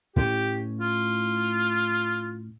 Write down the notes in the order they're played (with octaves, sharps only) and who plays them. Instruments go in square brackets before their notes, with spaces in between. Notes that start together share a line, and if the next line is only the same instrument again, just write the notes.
[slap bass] A2 C#4 [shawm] G4
[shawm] F4